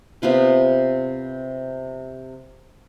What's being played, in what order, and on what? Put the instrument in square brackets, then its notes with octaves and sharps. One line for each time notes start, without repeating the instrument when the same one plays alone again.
[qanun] C3 B3 F4 B4